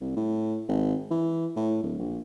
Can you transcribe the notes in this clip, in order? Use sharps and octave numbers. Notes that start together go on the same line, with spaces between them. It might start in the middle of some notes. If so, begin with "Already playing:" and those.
C2
A2
G#1
E3
A2
D1
A#1